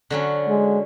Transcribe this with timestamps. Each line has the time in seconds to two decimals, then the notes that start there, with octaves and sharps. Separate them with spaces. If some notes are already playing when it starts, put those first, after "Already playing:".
0.10 D3 F#3 C#4
0.48 G#3